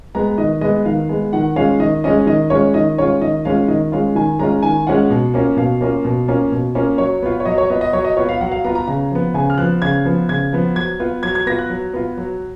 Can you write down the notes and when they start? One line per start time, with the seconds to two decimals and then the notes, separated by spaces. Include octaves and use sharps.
0.15 G#3 B3 A#5
0.38 D#3 D#5
0.61 G#3 B3 D#5
0.85 D#3 F5
1.09 G#3 B3
1.33 D#3 F#5
1.56 G#3 C#4 F4 F5
1.79 D#3 D#5
2.04 G#3 C#4 F4 D#5
2.27 D#3 D#5
2.50 G#3 C#4 F4 C#5
2.74 D#3 D#5
2.98 G#3 C#4 F4 C#5
3.22 D#3 D#5
3.45 G#3 C#4 F4 F5
3.68 D#3 D#5
3.92 G#3 C#4 F4 F5
4.15 D#3 G#5
4.39 G#3 C#4 F4 A#5
4.63 D#3 G#5
4.87 G#3 C#4 F4 F#5
5.10 B2
5.34 A#3 C#4 F4
5.57 B2 F5
5.81 A#3 C#4 F4
6.05 B2
6.28 A#3 C#4 F4
6.52 B2
6.75 A#3 C#4 F4
6.98 F#3 C#5
7.23 B3 F4
7.40 C#5
7.45 F#3 D#5
7.58 C#5
7.70 B3 F4 D#5
7.81 D#5
7.93 F#3 C#5
8.04 D#5
8.17 B3 F4 C#5
8.29 F5
8.41 F#3 F#5
8.52 F5
8.64 B3 F4 A#5
8.75 A#5
8.87 C#3 A#5
9.11 F3 B3
9.34 C#3 G#5
9.50 F6
9.58 F3 B3 F#6
9.82 C#3 G#6
10.05 F3 B3
10.29 C#3 G#6
10.53 F3 B3
10.76 F#3 G#6
11.00 B3 F4
11.23 F#3 G#6
11.35 G#6
11.46 B3 F4 A#6
11.59 F#6
11.70 F#3
11.94 B3 F4
12.18 F#3